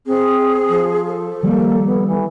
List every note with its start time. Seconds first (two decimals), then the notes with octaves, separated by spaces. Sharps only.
0.06 C4 G#4
0.69 F3
1.06 A4
1.43 D#3 F3 G3 A#3
1.86 B3
2.07 E3